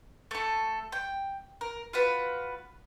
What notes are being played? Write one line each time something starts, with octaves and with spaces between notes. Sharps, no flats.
A3 A4
G5
A#4
F4 F#4 B4